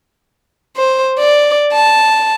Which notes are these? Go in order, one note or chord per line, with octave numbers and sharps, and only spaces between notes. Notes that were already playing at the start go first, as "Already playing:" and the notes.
C5
D5
A5